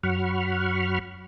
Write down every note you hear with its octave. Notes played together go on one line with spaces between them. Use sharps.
F#2 F#3 F#5 B5 C#6 F6